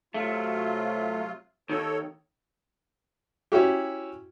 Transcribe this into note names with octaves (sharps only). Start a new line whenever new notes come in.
C3 F#3 A3 F4
D#2 G#2 D#3 A4 C#5
C#4 E4 F#4 G4